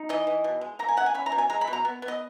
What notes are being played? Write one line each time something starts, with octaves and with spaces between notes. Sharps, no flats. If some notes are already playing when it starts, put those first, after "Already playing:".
Already playing: D#4
E3 D#5
E3
B2
G#3
A#3 A#5
G#5
C#4 F#5
G#5
C#4 B5
A#5
B2
G#5
G#3 A#5
B5
B2
A#5
B3
B3
D#5